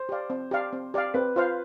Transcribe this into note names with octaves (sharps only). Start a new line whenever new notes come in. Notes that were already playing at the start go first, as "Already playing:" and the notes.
Already playing: C5
G4 D5 F5
C4
G4 D5 F5
C4
G4 D5 F5
C4 B4
F4 C5 F5